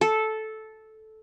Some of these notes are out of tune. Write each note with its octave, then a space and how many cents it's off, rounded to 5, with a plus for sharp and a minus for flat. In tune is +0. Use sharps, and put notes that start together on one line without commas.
A4 -10